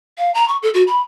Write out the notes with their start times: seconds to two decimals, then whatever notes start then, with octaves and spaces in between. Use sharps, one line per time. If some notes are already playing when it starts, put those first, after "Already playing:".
0.18 F5
0.34 A#5
0.48 C#6
0.63 A4
0.74 F#4
0.87 B5